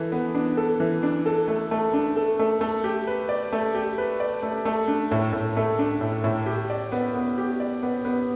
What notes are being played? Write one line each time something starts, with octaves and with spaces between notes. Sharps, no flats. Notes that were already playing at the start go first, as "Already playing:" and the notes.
Already playing: E3 A4
B3
D4
A4
E3
D4
A4
A3
A3
D4
A4
A3
A3
G4
B4
D5
A3
G4
B4
D5
A3
A3
D4
A2
A2
A3
D4
A2
A2
G4
D5
B3
B3
G4
D5
B3
B3